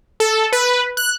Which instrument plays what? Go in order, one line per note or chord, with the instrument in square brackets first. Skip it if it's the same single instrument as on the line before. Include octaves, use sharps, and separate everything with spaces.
[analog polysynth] A4
B4
F#6